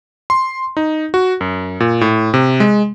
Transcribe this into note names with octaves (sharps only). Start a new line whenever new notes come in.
C6
D#4
F#4
F#2
A#2
A2
C3
G#3